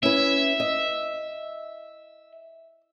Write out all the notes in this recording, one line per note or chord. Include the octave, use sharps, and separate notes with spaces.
C#4 E4 B4 E5
D#5